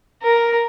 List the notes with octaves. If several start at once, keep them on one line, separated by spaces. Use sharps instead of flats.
A#4